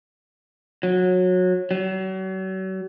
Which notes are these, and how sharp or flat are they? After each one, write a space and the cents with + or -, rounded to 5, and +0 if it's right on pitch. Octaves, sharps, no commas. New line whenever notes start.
F#3 -20
F#3 +40